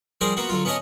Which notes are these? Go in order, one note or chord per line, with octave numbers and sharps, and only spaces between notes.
F3 G3 G#4 A#4 C5 D5
A#3 B3 F4 F#4
D3 F#3 F4
B3 C#4 D4 C#5 D#5 G#5